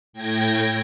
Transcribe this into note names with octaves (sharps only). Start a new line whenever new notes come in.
A2 G5 G#6 A#6